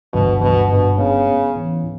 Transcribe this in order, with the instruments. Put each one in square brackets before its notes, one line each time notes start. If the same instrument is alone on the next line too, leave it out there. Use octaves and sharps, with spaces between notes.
[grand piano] G1 [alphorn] B2
[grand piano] G1 [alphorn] B2
[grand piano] G2 [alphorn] B2
[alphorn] C#3 [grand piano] B3
[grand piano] B3
E3
E3